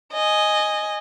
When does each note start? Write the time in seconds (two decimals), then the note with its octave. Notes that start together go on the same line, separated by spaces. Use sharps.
0.13 D#5 G#5